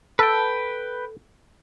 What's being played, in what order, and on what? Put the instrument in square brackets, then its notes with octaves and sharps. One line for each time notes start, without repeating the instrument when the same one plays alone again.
[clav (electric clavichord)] A4 [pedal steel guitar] B4 G5